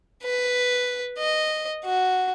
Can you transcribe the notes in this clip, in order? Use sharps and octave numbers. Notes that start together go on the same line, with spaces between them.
B4
D#5
F#4